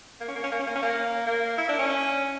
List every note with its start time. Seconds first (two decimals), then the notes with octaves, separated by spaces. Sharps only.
0.21 A#3
0.28 C#4
0.35 A#3
0.44 C#4
0.52 A#3
0.59 C#4
0.67 A#3
0.75 C#4
0.82 A#3
1.26 A#3
1.58 E4
1.68 D4
1.79 C#4